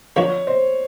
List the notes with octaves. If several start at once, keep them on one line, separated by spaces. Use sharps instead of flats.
D3 F3 A#3 D4 F#4 C#5
C5